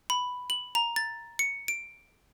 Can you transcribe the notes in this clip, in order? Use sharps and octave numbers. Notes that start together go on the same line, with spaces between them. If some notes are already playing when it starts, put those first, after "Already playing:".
B5
F#7
A#5
A6
C#7
D7